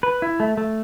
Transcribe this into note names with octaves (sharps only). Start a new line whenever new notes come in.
B4
E4
A3
A3